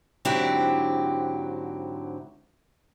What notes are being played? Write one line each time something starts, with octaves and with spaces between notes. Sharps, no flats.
G#2 D3 F#3 C4 E4 G4